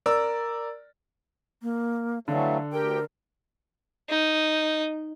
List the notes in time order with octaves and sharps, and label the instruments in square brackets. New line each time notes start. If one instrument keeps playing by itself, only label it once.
[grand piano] A#4 D5 E6
[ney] A#3
[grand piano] D3 [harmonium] E3 F#3 A3 [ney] F5
[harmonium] D2 G4 G5 [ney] A#4
[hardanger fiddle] D#4